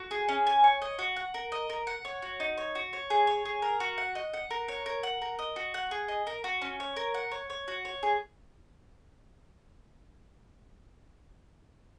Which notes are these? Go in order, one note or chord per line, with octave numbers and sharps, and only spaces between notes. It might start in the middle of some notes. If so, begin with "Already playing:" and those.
Already playing: F#4
G#4
C#4
G#5
C#5
D#5
F#4
F#5
A#4
D#5
A#4
F#5
C#5
F#4
D#4
C#5
F#4
C#5
G#4
C#5
G#4
A#4
F#4
F#5
D#5
F#5
A#4
C#5
A#4
F#5
A#4
D#5
F#4
F#5
G#4
D#5
A#4
F#4
C#4
C#5
A#4
F#5
C#5
C#5
F#4
C#5
G#4